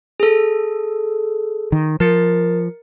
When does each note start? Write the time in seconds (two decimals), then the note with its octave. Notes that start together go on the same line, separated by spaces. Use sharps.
0.20 G#4 A4
1.72 D#3
2.00 F3 A#4 A6 C#7